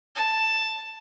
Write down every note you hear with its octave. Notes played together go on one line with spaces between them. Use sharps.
A5